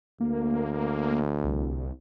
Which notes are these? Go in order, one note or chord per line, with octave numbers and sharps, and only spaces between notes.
D2 A#3
C2